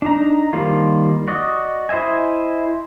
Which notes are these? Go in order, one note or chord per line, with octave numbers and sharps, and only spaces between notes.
D4 D#4 A#5
D#3 F3 G3 A#3 F4
F#4 D5 D#5
E4 C5 D#5 E5 G#5